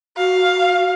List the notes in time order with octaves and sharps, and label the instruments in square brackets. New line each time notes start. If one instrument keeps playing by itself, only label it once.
[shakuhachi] F#4 [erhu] F5